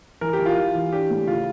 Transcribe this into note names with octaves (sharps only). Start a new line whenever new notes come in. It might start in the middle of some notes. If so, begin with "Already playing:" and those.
E3 A#4
G4
E3
F4
E3
E3
D4 G4
A2
C#3 F4